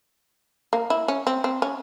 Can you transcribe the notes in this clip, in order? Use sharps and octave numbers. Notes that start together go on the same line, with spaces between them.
A#3
E4
C#4
C4
C4
C#4